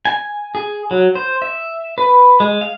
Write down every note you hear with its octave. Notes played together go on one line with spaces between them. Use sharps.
G#5
G#4
F#3
C5
E5
B4
G#3
F5